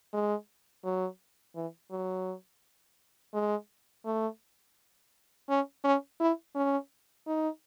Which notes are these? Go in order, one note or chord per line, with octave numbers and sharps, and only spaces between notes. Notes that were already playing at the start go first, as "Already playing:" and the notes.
G#3
F#3
E3
F#3
G#3
A3
C#4
C#4
E4
C#4
D#4